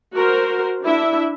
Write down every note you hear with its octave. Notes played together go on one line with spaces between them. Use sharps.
F#4 A#4 C5
D4 E4 E5